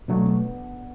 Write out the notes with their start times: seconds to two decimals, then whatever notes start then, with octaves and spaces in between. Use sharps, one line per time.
0.08 B2 F#3 A3 D4
0.26 B3